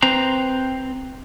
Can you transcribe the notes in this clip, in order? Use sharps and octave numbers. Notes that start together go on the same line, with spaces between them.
C4 B4 C5 A#5